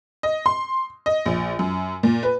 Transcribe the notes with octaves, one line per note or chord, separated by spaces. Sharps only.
D#5
C6
D#5
A#1
F#2
A#2
B4